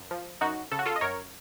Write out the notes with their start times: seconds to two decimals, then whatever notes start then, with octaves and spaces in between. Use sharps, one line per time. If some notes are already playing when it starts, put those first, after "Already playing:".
Already playing: F#2
0.11 F3
0.41 F#2 D#4 F#4
0.71 C#3 A4
0.79 F#4
0.86 F4 A4
0.96 D#5
1.01 F#2 A#4 C#5